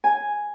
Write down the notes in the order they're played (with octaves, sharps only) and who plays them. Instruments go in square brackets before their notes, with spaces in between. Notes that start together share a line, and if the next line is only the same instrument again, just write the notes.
[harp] G#5